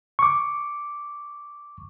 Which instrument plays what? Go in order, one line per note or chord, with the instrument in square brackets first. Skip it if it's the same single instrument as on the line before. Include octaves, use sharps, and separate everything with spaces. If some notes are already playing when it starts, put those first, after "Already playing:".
[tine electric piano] C#6 D6